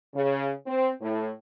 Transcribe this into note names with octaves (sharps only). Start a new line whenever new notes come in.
C#3
C4
A2